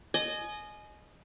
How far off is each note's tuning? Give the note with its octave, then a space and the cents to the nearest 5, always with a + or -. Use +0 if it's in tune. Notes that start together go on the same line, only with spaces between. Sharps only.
D#5 -20 G#5 +25